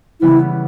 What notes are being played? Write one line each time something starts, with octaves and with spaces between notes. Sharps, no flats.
C#3 E3 G3 B3 E4